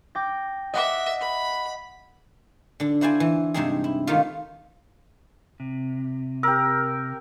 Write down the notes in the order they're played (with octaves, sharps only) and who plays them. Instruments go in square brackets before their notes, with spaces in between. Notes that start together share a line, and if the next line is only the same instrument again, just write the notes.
[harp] G5 D6 A#6
[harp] D#5 F#5 D6 [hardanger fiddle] E5
[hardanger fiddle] B5
[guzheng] D3 D4
E4 F#4 C5 D5 G#5
E3
G2 C3 G#3 C4 D#4 G#4
E4
C3 D#3 A3 D#4 F4
[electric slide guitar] C3
[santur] G4 A#4 [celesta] E6